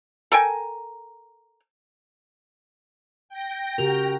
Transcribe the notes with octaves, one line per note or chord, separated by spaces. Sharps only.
A4 A#4 G5 G#5
G5 A#6
C#3 F#4 G4 A#4 F7